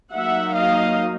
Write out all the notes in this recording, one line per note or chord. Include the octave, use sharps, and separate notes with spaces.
F#3 A#3 D#4 E5 F#5
D#5 F5